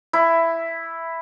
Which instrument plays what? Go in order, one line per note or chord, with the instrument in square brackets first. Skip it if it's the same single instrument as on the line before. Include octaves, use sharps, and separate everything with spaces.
[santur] E4